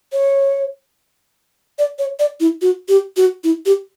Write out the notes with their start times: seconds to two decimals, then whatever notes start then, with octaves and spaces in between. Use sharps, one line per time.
0.13 C#5
1.79 D5
1.99 C#5
2.19 D5
2.40 E4
2.62 F#4
2.89 G4
3.17 F#4
3.44 E4
3.66 G4